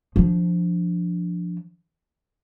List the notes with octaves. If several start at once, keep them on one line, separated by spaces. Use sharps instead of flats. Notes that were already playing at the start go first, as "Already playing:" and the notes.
F3 D4